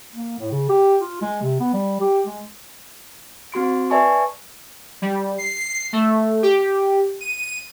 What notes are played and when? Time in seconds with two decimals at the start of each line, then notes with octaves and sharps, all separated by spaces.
0.14 A#3
0.39 A2
0.52 C#3
0.69 G4
1.01 F4
1.22 G#3
1.42 C3
1.60 B3
1.73 G3
2.01 G4
2.26 G#3
3.52 C4 F#4 C6 D7
3.90 B4 D5 E5 G#5 A5 C#6
5.02 G3
5.38 C7
5.93 A3
6.43 G4
7.21 D#7